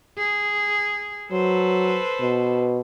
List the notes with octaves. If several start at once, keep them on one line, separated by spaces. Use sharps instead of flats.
G#4
F#3 A4 B4 C5
B2